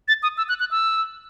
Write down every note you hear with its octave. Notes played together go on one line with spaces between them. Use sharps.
A6
D#6
E6
F#6
F#6
E6